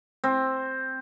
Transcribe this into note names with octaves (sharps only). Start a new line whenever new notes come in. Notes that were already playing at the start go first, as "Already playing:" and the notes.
C4